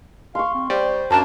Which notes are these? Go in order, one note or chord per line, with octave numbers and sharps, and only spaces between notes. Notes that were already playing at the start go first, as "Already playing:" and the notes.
F5 C6 C#6
C4
G3 C5 G5
F#2 A#3 D4 A5